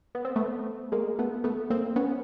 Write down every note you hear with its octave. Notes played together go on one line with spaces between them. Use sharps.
B3
C4
A3 B3
G#3 A#3
A3 B3
A3 B3
A#3 C4
B3 C#4